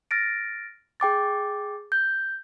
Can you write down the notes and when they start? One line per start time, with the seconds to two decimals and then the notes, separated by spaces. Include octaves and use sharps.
0.11 F6 A6 A#6 D7
1.00 G#4 G5 D6 A6
1.92 G6